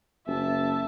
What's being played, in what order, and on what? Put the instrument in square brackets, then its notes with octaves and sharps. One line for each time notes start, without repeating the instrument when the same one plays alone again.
[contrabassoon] F#1 [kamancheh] E5 A5